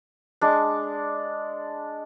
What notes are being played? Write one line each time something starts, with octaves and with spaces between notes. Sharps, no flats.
G#3 D4